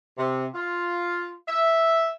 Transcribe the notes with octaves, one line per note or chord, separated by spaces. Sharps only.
C3
F4
E5